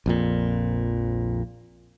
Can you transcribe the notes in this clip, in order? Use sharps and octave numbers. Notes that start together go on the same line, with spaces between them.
A#1 F2 A#2